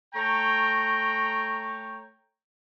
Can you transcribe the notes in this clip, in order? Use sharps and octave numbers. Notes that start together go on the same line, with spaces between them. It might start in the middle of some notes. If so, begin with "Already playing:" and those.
A3 C#5 G5 A#5